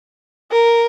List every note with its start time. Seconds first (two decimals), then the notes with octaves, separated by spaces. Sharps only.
0.52 A#4